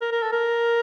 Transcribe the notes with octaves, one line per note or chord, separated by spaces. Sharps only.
A#4
A#4
A4
A#4